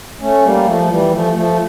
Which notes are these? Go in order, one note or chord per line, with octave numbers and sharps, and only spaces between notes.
A3 C#4
G3 A#3
F3 A3
A3
E3 G3
F3 A3
F3 A3